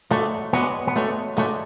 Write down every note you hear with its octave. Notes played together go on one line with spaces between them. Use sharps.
G#3 A3 D4 F#4 C#5
G#3 B3 D4 F#4 C#5
B3
G#3 A3 D4 F#4 C#5
G#3 A3 D4 F#4 C#5